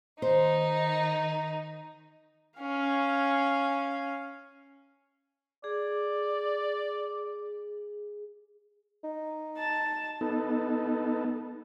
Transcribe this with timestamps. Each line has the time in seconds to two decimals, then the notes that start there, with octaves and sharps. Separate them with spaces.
0.22 D#3 D#4 C5
2.60 C#4 F5
5.64 G#4 D5
9.04 D#4
9.58 A5
10.21 B3 D#4 A4